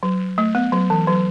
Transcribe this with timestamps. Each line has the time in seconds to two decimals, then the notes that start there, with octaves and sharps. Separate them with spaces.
0.03 F#3
0.38 A3
0.55 B3
0.72 F#3
0.90 E3
1.07 F#3